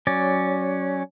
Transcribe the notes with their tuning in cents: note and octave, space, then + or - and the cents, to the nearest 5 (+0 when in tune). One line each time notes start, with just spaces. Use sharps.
F#3 +10 C#4 +0 D5 +0